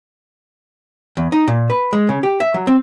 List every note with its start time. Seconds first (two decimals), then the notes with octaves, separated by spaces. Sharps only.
1.17 E2
1.32 D#4
1.48 A#2
1.70 B4
1.93 G#3
2.09 C#3
2.23 G4
2.40 E5
2.54 F#3
2.67 C4